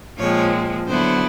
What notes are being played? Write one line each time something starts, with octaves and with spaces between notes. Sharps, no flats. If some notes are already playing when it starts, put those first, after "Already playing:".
A#2 F3 G#3 C4 C#5
D3 F#3 B3 E4 C5